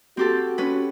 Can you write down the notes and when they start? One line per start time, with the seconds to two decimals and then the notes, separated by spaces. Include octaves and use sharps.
0.17 C4 F#4 G4 A4
0.58 C#4 B4